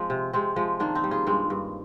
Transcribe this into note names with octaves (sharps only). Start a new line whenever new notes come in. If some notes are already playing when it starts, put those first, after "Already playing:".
Already playing: F3 G#3 C4
C3
C3 G#3 C4
F3 G#3
D#3 A#3 D4
C4 D#4
G3
F4 G#4
G2 G#3 C4
G2